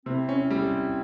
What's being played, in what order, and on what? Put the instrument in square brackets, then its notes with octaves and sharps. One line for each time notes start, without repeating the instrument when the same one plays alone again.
[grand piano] C3 [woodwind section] C4 E4
[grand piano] C#4
G3